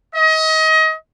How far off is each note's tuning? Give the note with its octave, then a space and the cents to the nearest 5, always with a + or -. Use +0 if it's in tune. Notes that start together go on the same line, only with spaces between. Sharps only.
D#5 +30